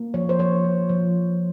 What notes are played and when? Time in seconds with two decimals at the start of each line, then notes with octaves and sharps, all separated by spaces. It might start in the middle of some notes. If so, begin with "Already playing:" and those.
Already playing: A#3
0.14 F3 C#5
0.29 C5
0.39 F3 C#5
0.65 F3
0.89 F3